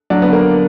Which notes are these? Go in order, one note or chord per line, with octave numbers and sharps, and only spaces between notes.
F#3 D4
D3 B3
A#3